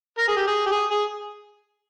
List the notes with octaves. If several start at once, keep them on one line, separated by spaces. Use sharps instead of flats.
A#4
G#4
G4
G#4
G4
G#4
G#4